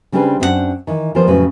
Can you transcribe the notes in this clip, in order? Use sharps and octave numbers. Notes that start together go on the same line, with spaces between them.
C#3 G3 C4 D4 G#4 B4
F#2 C4 D4 F4 F#5
D#3 E3
E3 F3 G3 B3 A#4 C5
F2 A2 C#3 F#3 B4